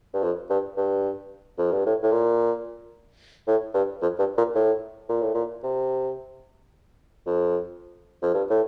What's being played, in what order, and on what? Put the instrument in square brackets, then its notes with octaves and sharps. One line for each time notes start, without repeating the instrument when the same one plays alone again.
[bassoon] G2
F2
G2
G2
F2
G2
A2
A2
A#2
A2
G2
F2
G2
A#2
A2
A#2
A2
A#2
C3
F2
F2
G2
A2